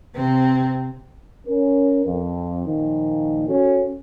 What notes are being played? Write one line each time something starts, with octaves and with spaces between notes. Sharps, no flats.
C3 C4
C#4 A#4
F2
A#2 D#3 F3
C#4 F#4 A4